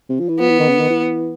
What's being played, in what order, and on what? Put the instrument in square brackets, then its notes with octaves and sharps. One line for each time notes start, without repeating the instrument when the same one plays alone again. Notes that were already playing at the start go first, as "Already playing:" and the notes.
[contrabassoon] C3
F3
E3
[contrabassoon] F3 [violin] B3
[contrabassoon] E3
D#3
C#3
D3
D#3
E3